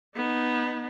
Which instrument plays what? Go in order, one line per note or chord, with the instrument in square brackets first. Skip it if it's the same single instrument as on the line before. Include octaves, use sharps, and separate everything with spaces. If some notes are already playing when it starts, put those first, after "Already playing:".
[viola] B3 D#4